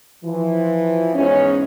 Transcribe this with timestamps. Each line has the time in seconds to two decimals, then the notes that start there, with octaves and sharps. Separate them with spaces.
0.24 E3 F3
1.14 E2 G#2 C#4